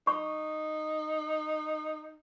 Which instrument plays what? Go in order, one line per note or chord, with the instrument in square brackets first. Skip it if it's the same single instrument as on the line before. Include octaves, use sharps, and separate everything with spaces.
[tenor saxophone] D#4 [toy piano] C#6